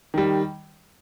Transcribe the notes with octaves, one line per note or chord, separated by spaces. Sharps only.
D#3 G3